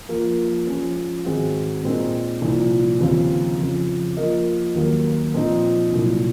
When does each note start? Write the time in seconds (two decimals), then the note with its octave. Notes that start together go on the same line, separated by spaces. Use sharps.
0.08 F3 A#3 F4
0.67 F3 G#3 C#4
1.25 G#2 D#3 G#3 C4 F#4
1.83 A#2 G#3 C4 D#4 A#4
2.41 C2 A#2 F3
3.00 D#2 C#3 F3 C4 F4
3.58 F2 C#3 F3
4.17 F3 A#3 F4 A#4 D#5
4.75 D#2 D#3 F#3 A#3
5.34 A#2 F3 C4 D#4
5.92 C2 A#2 F#3